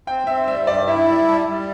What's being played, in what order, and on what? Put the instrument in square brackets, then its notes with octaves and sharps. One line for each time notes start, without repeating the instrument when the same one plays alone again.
[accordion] C4 [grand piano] G5
[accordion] C4 [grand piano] E5
[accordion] G3 [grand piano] E5
[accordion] G2 [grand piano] D5
[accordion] E4 [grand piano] E5
[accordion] G3
[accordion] G3 [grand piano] A5
[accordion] G3